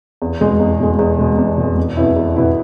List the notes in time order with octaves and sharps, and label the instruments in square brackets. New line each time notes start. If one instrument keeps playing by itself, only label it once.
[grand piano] E2
B2 G#3
E2
B2 G#3
E2
B2 G#3
E2
B2 G#3
E2
B2 B3 E4
E2
B2 B3 E4